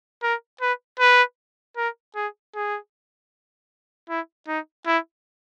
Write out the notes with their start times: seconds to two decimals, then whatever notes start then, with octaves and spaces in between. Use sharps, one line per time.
0.23 A#4
0.61 B4
1.00 B4
1.77 A#4
2.15 G#4
2.55 G#4
4.09 E4
4.48 D#4
4.86 E4